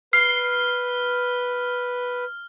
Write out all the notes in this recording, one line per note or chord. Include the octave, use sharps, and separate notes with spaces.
B4 F6 C7